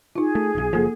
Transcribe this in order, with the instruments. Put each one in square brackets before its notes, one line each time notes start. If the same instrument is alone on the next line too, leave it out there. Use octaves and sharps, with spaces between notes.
[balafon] D#4 F4 [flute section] G#4
[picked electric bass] A3
D#1 B1
[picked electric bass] F#1 B1 F3 [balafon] A#3 A4